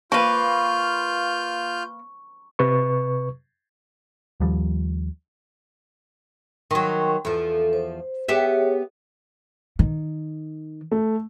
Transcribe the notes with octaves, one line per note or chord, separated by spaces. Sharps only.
A#3 F4 B4 C#6 F6 G6
C3 B4 C#6
D#2 F3 G3
D#3 F#3 G5 C6 C#6
E2 F3 A4
C5
B3 G4 G#4 C#5 E5
D#3
A3